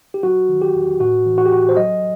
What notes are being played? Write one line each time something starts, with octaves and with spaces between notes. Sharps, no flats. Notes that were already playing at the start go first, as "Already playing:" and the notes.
G4
F#3 F#4
D#3
G4
E2
A2 F#4
E3
F#4
G4
A2 F#4
C5
F#3 D#5